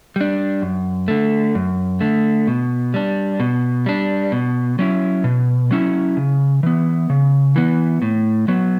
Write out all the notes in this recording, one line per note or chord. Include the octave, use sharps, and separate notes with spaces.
G3 D4
F#2
D3 A3
F#2
D3 A3
B2
G3 D4
B2
G3 D4
B2
F#3 C#4 E4
B2
F#3 C#4 E4
C#3
E3 B3
C#3
E3 B3
A2
F#3 B3